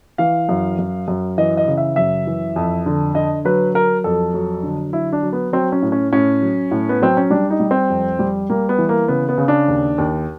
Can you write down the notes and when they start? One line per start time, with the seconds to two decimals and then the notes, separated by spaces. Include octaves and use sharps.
0.18 E3 F5
0.49 F#2
0.79 F#2
1.08 F#2
1.38 E3 D#5
1.57 D#5
1.67 C#3
1.77 E5
1.96 F#2 E5
2.27 E3
2.56 F2
2.86 D3
3.15 D3 D#5
3.45 F#3 B4
3.74 F#3 A#4
4.04 F2 A4
4.34 F#3
4.63 D3
4.93 F#3 E4
5.13 D4
5.23 F#3
5.33 B3
5.53 F#3 C4
5.72 C#4
5.82 A2
5.92 C#4
6.13 A2 C#4
6.42 F#3
6.71 A2
6.89 B3
7.02 F#3 C4
7.17 C#4
7.30 G3 D4
7.50 D#4
7.60 G3
7.71 C4
7.90 F2
8.19 G3
8.50 G3 A#3
8.69 B3
8.79 E3
8.89 A#3
9.08 C#3 B3
9.29 B3
9.38 C#3
9.48 D4
9.68 D#2
9.98 D#2